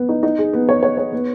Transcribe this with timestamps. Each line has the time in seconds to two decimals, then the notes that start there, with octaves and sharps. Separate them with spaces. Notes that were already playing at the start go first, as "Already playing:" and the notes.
Already playing: B3
0.09 D#4
0.23 D#4
0.39 G#4
0.53 B3
0.69 C#5
0.83 C#5
0.98 C#5
1.13 B3